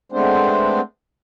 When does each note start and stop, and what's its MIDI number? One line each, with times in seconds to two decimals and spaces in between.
0.12 0.81 56
0.12 0.81 57
0.12 0.81 59
0.12 0.81 60
0.12 0.81 62
0.12 0.81 72